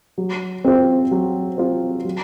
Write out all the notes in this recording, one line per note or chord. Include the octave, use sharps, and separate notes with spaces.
F#3
C4 F4 C5
F#3
C4 F4 C5
F#3